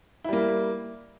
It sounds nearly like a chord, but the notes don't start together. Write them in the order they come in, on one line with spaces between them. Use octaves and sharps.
E4 G3 A#3